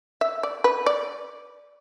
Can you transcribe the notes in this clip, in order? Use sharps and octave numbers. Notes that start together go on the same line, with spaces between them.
E5
D5
B4
D5